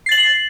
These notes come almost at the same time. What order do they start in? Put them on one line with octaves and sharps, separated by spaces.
C7 A6 F#7